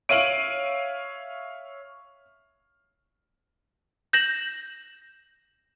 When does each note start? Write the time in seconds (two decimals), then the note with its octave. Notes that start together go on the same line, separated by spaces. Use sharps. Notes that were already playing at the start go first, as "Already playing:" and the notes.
0.09 C#5 E5 F5 D7 D#7 F#7
4.13 G6 A#6 E7 F#7